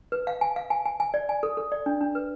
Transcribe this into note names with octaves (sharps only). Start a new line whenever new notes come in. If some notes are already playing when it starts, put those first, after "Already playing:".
B4
F5
G#5
F5
G#5
G#5
G#5
D5
G#5
A4
A4
D5
D4
D4
B4